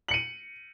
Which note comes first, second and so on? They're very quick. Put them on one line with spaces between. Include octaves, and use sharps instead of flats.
F#7 C#7 D#7